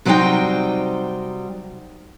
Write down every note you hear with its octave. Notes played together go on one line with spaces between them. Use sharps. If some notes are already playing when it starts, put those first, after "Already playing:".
C3 F#3 G3 D#4 C5 G5